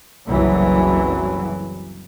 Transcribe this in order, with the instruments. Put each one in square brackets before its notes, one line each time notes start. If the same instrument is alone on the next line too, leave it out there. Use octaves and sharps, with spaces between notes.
[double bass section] F#1 C2 E3 F#3